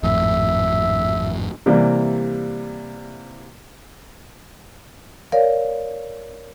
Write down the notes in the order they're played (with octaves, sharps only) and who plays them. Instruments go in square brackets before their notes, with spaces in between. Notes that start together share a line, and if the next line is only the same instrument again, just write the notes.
[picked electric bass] G#1 F2 A2 [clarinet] E5
[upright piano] C3 E3 G3 A#3
[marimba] A#4 C#5 D5 F5